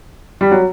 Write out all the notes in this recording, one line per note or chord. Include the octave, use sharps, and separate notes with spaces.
G3
F#3